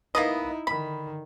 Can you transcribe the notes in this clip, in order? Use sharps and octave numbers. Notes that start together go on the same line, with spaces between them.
A#3 B3 D#4 E4 D#5
D3 D#3 B5